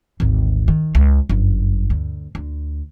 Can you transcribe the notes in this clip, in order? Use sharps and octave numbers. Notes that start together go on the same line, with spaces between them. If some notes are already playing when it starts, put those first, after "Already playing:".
G#1 D2
D#3
C#2
G1 F#2
D2
D2